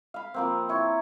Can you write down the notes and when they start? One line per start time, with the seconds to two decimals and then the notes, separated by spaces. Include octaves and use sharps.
0.14 F5 B5
0.34 F3 A#3 C4
0.69 E4 C#5